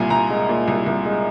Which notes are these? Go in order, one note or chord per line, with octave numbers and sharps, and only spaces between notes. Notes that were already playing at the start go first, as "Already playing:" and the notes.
Already playing: C2 A#2 G#5
C2 A#5
G#3
A#2
C2
C2
G#3